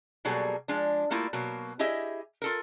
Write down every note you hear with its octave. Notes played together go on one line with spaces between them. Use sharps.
B2 F#3 G3 A#3 G#4 A4
F3 G#3 D4
G3 A3 A#3 E4 F4
B2 F#3 A#3
E4 G4 G#4 D#5 E5
F4 A4 A#4